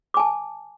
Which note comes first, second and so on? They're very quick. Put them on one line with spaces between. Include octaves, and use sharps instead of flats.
D6 G#5 A5